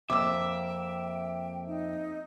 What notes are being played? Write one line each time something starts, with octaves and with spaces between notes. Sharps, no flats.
F2 A#3 E5 G5 D6 E6
D#4